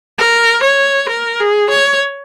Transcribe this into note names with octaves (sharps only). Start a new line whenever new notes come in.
A#4
C#5
A#4
G#4
C#5